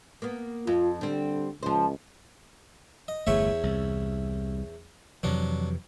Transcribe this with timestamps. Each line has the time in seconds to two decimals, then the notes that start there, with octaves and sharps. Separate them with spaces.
0.22 A#3 B3
0.67 F2 F4
1.01 D3 G3 C4
1.63 C#2 F3 C5
3.08 D#5
3.27 G1 E2 A3 C#5 E5
3.63 C2
5.23 F2 C3 E3 F#3 D4